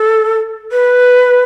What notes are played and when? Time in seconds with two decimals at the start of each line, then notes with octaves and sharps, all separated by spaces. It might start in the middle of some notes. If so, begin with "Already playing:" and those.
Already playing: A4
0.72 B4